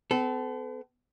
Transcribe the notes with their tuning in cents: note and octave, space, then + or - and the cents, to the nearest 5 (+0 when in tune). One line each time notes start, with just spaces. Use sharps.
B3 +45 A4 -20